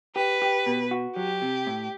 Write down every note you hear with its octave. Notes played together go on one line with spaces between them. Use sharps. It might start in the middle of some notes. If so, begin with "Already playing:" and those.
G4 B4
G4
B2
F#4
F#3 G4
C3
A2